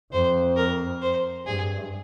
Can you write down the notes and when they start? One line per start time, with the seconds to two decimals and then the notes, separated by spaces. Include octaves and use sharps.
0.12 F2 C5
0.57 A#4
1.02 C5
1.46 G2 G#4